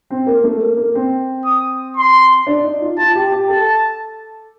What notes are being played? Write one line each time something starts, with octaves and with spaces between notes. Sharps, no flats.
C4
A#3
A3
A#3
A#3
C4
D#6
C6
D4
D#4
F4
F4 A5
G4
G4
A4 A5